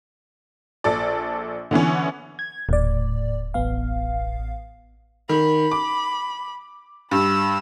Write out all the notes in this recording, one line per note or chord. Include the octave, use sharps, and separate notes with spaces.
A#1 A4 D5
D3 E3 B3 C#4
G#6
D#1 A2 D5
A1 B3 F5
D#3 B5
D6
G2 B5 E6